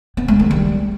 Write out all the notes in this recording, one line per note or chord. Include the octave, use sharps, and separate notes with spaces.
B3
G#3
D#3
G3